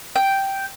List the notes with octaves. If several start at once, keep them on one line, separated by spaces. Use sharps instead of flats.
G5